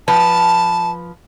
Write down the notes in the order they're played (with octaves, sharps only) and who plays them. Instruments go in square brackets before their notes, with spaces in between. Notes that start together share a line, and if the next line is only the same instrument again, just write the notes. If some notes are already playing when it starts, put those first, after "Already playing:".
[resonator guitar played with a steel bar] F3 B4 [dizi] A5